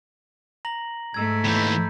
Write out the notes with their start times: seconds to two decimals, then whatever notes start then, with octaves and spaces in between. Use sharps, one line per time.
0.65 A#5 A#6 F#7
1.14 G#2 A3 A#5 E6 G#6
1.45 D#2 E3 B5 G6